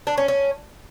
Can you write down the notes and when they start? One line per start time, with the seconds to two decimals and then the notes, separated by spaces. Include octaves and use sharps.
0.07 D4
0.18 C#4
0.28 C#4